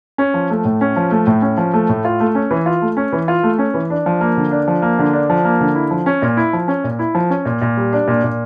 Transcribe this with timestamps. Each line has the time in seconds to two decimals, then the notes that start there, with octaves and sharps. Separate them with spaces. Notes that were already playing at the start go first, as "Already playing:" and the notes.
0.18 C#4
0.34 F3
0.50 A3
0.65 A2
0.81 C#4
0.96 F3
1.11 A3
1.27 A2
1.42 C#4
1.57 F3
1.74 A3
1.89 A2
2.05 F4
2.20 A3
2.35 C#4
2.51 E3
2.66 F4
2.82 A3
2.97 C#4
3.12 E3
3.28 F4
3.43 A3
3.59 C#4
3.74 E3
3.90 D4
4.06 F3
4.21 A#3
4.37 D3
4.51 D4
4.68 F3
4.82 A#3
4.99 D3
5.13 D4
5.30 F3
5.45 A#3
5.60 D3
5.75 E4
5.91 F3
6.06 C#4
6.22 A#2
6.37 E4
6.53 F3
6.68 C#4
6.84 A#2
6.99 E4
7.15 F3
7.30 C#4
7.45 A#2
7.62 A#2
7.77 G3
7.93 D4
8.08 A#2
8.24 A#2